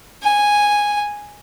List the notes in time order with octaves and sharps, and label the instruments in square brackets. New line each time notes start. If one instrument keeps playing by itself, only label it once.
[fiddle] G#5